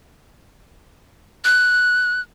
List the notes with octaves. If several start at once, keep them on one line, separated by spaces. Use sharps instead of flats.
F#6